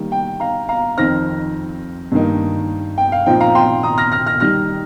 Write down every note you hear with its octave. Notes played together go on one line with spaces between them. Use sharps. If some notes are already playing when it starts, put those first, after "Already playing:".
Already playing: D#3 G3 A#3
G5
F5 A#5
F5 A#5
F2 D#3 C4 D#4 F6 A#6
G2 D#3 A#3 D#4
G5
F5
A#2 F3 C4 D#4 G5
F5 A#5
G5 C6
A#5 D#6
F6 A#6
F6 A#6
F6 A#6
D#3 G3 D#4 F6 A#6